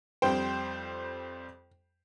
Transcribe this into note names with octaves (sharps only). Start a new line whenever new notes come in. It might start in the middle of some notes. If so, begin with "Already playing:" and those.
F2 G3 C5 G5